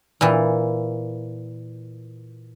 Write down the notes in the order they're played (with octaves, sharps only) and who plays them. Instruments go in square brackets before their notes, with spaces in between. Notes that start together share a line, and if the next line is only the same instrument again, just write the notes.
[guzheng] A#2 E3